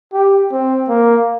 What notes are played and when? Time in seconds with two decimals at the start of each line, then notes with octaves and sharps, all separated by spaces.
0.13 G4
0.52 C4
0.89 A#3